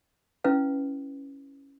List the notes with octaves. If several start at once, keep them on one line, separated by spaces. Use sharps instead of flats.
C#4 E4 B4 F5